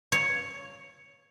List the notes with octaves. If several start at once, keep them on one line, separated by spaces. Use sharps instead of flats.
C#5